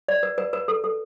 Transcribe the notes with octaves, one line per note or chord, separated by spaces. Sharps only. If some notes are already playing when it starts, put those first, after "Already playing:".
D5
B4
B4
B4
A4
A4